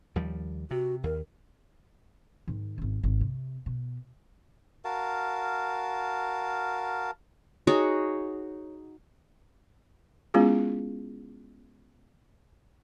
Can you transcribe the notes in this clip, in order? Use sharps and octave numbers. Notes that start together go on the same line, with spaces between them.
D#2 F3 G3
C3 F#4
D#2 A#4
G#2 D#3
G#1 C#4
G#1
C3
B2
F#4 A#4 F5 A5
D#4 F#4 G#4 C#5
G#3 B3 C#4 E4 F4 G#4